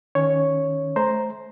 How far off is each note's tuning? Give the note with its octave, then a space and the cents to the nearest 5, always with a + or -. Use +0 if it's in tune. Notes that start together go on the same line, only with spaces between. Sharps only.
D#3 +0 C#4 +0 C#5 +0
A3 -30 C5 +0 A#5 +0